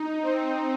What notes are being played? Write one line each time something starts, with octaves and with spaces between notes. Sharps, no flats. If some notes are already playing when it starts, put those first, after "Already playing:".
Already playing: D#4
C4